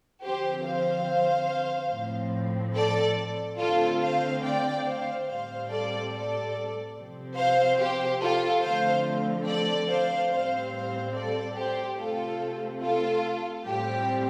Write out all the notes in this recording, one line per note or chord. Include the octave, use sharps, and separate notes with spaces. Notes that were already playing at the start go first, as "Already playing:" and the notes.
D3 F3 C4 G4 C5
C5 F5
A2 F3 C4
A4 D5
D3 A3 C4 F4 A4
C5 F5
D5 G5
C5 F5
A2 G3 C4 C5 F5
A4 D5
A4 D5
C3 F3 C4
C5 F5
G4 C5
F4 A4
D3 F3 A3 C4 C5 F5
A4 D5
C5 F5
A2 G3 C4 C5 F5
C5 F5
A4 D5
G4 C5
C3 A3 C4 F4 A4
F4 A4
A2 G3 C4 G4